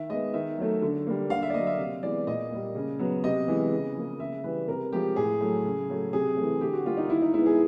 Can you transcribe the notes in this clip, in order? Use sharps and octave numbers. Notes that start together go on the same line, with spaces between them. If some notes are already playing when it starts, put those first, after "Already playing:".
Already playing: D#3 E5
G#3 B3 D#5
D#3 E5
F#3 A3
D3
G3 A#3
D3 F5
E5
D5
F#3 A#3 D#5
E5
C3
E3 G#3 B3 D5
A#2 D#5
G3 A#3
C#3
F#3 B3
C3 D#5
E3 G#3 B3
C#3
F3 A#3
C#3 E5
E3 G3 B4
C3 A#4
F3 G#3 G4
A2 G#4
F#3 A3
C#3
F#3 A3
C3 G#4
E3 A3
D3 G4
F#4
G3 A#3 F4
D#4
D#3 E4
D#4
G#3 B3 E4
G#4